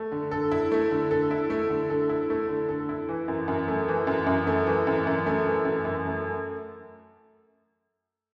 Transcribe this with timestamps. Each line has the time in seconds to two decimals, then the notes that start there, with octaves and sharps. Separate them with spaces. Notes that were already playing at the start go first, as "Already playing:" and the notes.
Already playing: A3
0.12 D3
0.31 A4
0.51 E4
0.72 A3
0.91 D3
1.11 A4
1.31 E4
1.50 A3
1.70 D3
1.90 A4
2.09 E4
2.30 A3
2.49 D3
2.69 A4
2.89 E4
3.08 E3
3.28 F#2
3.48 F#2
3.68 A3
3.88 E3
4.07 F#2
4.27 F#2
4.47 A3
4.66 E3
4.87 F#2
5.07 F#2
5.26 A3
5.46 E3
5.65 F#2
5.85 F#2
6.05 A3